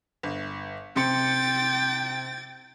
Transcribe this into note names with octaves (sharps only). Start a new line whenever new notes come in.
G1
C3 G5 C6 A6 C#7